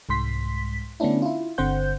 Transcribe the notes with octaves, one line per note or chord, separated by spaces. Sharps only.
C2 G#2 C6 B6
D3 A3 B3 C#4 D4 E4
E4 F4
G1 D3 C4 C5 F#5 G6